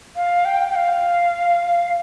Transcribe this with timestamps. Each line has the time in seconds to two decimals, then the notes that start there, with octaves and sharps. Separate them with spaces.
0.16 F5
0.45 G5
0.69 G5
0.75 F5